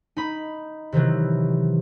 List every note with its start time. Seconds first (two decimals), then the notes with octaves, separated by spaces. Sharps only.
0.17 D#4 B5
0.92 C3 D#3 E3 F#3